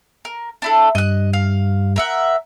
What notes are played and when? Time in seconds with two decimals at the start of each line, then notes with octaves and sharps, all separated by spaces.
0.25 A#4
0.62 D4 E4 A4
0.95 G2 D#5 F#6
1.33 F5
1.96 A#4 E5 F#5